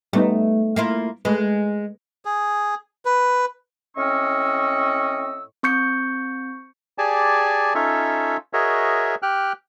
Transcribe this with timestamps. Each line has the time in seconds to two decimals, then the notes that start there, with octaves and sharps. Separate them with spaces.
0.13 G3 A3 B3 D#4
0.76 A#3 E4 F4
1.25 G#3 A3 G#4 B4
2.25 G#4
3.05 B4
3.96 A2 C4 C#4 D#5 C#6 E6
5.63 C4 C#6 G6 C#7
6.98 G4 G#4 D5 G#5 A5
7.75 C#4 D#4 F4 A4 C#5 E5
8.53 F#4 G#4 A#4 C#5 D#5 E5
9.22 G4 G5 F6 F#6